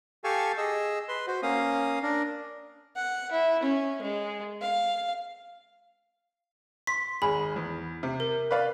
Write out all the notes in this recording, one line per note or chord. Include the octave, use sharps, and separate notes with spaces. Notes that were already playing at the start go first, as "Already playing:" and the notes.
G4 A4 F5 G#5 A5 C#6
G#4 D#5 E6
B4 C6
F#4 C5
A#3 C#4 F5 D#6
D4 A#4
F#5
E4
C#4
G#3
F5
C6 B6
G#1 G#4 B5
E2
C3
A#4
B4 D5 F5